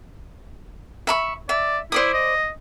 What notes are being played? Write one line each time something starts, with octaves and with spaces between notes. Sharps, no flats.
E5 B5 C#6
D5 E5
E4 C5 D5 D#6
D#5